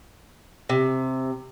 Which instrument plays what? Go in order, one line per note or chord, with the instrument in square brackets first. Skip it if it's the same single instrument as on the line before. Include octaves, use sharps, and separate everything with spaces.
[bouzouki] C3